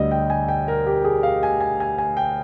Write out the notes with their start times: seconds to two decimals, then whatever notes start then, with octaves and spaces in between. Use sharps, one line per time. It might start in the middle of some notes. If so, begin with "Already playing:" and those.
Already playing: D2 D3 G3 D5 D#5
0.11 G5
0.30 G#5
0.48 G5
0.68 A#4
0.86 G4
1.04 G#4
1.23 F5
1.43 G#5
1.61 G#5
1.80 G#5
1.98 G#5
2.17 G5